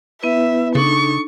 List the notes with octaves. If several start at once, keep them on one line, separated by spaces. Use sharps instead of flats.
B3 E4 B4 E5
C#3 D4 D#4 A4 C#6